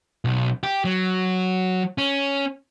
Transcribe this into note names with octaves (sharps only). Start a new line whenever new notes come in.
B1
G4
F#3
C#4